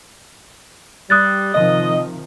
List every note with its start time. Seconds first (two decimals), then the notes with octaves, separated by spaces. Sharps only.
1.10 G3 D#6 F#6 A6
1.54 C3 D#3 F3 D#5